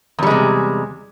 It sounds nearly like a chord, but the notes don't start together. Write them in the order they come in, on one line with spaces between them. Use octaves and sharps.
E2 G3 G#3 C3